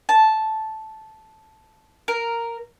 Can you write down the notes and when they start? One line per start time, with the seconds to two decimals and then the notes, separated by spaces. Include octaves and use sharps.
0.09 A5
2.08 A#4